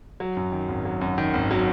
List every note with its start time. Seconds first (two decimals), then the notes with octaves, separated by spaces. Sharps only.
0.20 F#3
0.37 F#2
0.52 D#3
0.69 G#1
0.85 F#3
1.01 F#2
1.18 D#3
1.34 G#1
1.51 F#3